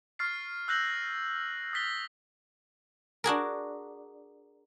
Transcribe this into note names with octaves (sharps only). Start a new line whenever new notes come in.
C#6 F6 A6 C7
E6 F#6 G6 A#6 F#7
D#6 A6 B6 G7
D4 F#4 G#4 A#4